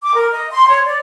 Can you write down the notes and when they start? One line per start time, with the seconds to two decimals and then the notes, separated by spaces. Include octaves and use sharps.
0.03 D6
0.14 A#4
0.32 D#5
0.51 C6
0.68 C#5
0.85 D5